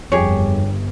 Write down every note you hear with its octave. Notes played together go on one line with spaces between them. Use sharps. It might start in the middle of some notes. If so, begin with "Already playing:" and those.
G1 F2 G4 G#4 C#5